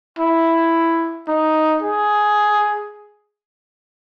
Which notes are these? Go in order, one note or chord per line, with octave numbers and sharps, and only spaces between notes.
E4
D#4
G#4